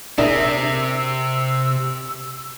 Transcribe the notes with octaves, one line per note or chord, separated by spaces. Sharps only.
C3 D4 G#4 A#4 E5 E6